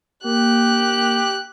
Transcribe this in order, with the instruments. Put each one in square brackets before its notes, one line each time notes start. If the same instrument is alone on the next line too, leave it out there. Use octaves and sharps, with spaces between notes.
[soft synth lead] A#3 [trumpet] G4 [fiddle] F#6